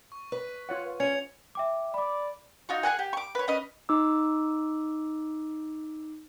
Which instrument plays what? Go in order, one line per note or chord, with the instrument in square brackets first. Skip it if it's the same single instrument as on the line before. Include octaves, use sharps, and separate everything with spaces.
[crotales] C#6
[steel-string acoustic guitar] B4
[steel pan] F4 C#5 F#5
[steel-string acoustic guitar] C#4 [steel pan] G#5 [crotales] G#6 C#7 F7
[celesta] E5 G5 D6
[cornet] D5 [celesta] B5 D6
[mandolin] D#4 F4 F#4
G#4 A4 F#5 G#5
G4
C#6 D6
B4 C#5
C#4 B4 D#5
[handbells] D#4 D6 E6